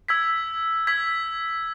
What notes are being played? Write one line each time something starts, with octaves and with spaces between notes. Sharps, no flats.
E6 G#6 B6
E6 G#6 B6